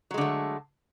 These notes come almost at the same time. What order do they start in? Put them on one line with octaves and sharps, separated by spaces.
F#3 G#3 D3 A3